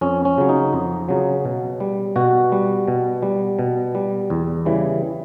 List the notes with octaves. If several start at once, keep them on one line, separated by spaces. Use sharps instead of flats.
F2 C#4
C#4
C#3 F#3
D#4
F2
C#3 F#3
B2
G3
B2 F#4
G3
B2
G3
B2
G3
E2
C#3 E3 G3